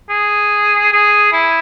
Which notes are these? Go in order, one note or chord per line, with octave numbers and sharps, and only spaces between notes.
G#4
G#4
E4